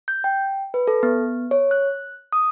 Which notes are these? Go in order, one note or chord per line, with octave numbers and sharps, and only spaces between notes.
G6
G5
B4
A4
B3
C#5
F#6
D#6